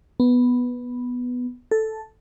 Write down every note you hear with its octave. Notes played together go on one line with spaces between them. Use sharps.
B3
A4